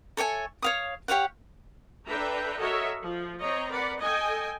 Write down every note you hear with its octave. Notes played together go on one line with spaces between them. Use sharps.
A4 C#5 E5 G#5
C#5 F5 D#6
G4 C#5 F5 F#5
D4 A4 B4 E5 G5 A#5
F#4 A4 A#4 C#5 D#5 E5
F3
C4 C#5 D#5 A#5
A#4 B4 D5 F#5
A4 D#5 G5 G#5